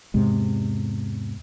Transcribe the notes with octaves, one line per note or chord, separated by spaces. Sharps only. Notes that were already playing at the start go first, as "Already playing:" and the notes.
E2 G#2 C3 G#3